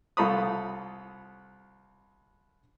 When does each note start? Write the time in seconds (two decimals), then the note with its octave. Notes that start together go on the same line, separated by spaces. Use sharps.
0.17 C2 F4 A4 A#5 B5 D#6